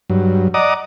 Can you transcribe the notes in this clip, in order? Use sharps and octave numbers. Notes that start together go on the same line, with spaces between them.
G2 F#3
D5 D#5 F#5 A#5 D6 D#6